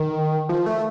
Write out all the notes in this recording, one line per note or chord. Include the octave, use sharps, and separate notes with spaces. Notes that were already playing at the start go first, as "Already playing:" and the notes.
Already playing: D#3
F3
A3